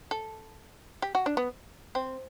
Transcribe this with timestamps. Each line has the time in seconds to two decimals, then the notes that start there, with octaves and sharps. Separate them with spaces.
0.11 A4
1.02 G4
1.15 F#4
1.26 D4
1.37 B3
1.95 C4